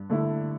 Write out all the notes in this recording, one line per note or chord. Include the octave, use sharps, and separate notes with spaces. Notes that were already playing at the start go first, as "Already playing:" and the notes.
Already playing: G2
D3 A3 E4